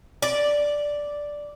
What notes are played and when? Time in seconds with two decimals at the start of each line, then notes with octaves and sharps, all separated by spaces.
0.22 D5